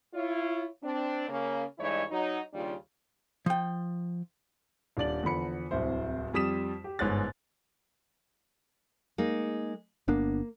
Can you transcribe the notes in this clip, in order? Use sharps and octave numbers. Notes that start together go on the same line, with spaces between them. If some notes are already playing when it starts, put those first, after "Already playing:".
E4 F4 C#5
C4 D4
C#3 A#3 C#4
G2 E3 G#3 D#4 E4 C#5
F#3 D#4
D#2 C#3 G3 D4 F4
F3 G5
D#1 D4 D5 F#7
E2 D3 F3 B5 C#7
D1 C2 E4 C5
F2 G3 D#6 B6 E7
G4
G1 G#2 C#5 F#6 A6
G#3 A#3 D#4
G1 A#3 B3 D4